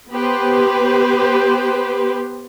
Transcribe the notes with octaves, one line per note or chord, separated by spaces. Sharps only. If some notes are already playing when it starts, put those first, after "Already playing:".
B3 G4 B4 C5